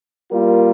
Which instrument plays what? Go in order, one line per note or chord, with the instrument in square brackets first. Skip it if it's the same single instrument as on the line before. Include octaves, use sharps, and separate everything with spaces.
[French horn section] G3 A#3 F4 A#4